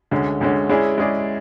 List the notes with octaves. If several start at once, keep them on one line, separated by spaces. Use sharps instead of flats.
D2 D3 G#3 C#4
D2 D3 G#3 C#4
G#3 C#4 E4 G#4 D5
G#3 C#4 E4 G#4 D5